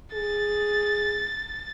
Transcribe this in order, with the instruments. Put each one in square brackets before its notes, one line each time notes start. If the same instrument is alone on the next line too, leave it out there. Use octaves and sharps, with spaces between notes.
[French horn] G#4 [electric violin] A6